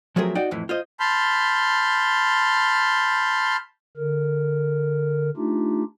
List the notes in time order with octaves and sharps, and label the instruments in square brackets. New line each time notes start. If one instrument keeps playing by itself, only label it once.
[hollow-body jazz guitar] F3 F#3 A3 C4 G#4 A#4
D#4 F#4 D5 G5
F2 A2 E3
F4 C5 D#5
[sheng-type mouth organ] A5 B5 C6 F6 G6
[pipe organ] D3 A#4
A3 D4 D#4 F4 G4